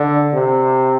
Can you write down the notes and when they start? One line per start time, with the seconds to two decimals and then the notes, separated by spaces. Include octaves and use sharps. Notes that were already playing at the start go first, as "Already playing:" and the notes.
Already playing: D3
0.34 C3